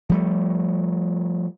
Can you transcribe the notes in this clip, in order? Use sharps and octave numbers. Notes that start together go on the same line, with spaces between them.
F3 G3 A3